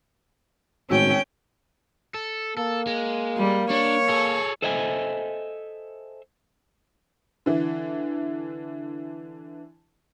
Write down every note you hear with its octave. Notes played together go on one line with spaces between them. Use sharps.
G#1 A2 C#4 F#4 G5 E6
A4
A#3 A4
G#3
G3
D4 C#5
G#4 A4
A4 C5 D#5 E5 G5 G#5
D3 E3